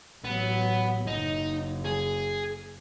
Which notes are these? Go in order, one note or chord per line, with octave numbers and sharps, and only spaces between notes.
A1 F#3 B3
F#1 D#4
G#4